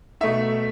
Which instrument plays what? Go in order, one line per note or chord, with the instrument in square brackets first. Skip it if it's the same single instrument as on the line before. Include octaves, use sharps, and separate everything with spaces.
[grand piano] B2 A3 D#4 E5